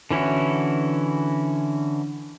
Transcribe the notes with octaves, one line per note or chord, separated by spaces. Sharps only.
D3 E3 C#4 E4 F#4